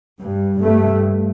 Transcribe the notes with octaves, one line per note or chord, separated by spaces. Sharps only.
G2
G2 A3